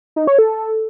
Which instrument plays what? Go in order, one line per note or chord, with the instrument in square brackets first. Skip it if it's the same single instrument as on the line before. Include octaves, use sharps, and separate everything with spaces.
[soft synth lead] D#4
C#5
A4